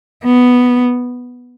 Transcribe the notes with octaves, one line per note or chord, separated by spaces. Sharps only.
B3